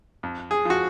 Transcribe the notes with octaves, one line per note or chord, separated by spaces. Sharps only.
F2
G#4
F3 F#4